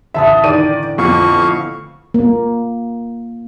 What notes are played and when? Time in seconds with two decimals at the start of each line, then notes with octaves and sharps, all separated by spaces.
0.14 A1 D3 E5 A5 D#6
0.44 D#3 D5 D#7
0.98 F2 B3 E4 F5 C#6
2.14 A#3